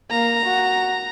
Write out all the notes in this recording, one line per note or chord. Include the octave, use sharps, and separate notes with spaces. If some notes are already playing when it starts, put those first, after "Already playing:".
A#3 A#5
F#4